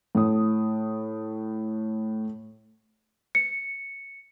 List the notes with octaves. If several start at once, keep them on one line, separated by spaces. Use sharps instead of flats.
A2 D#6
C#7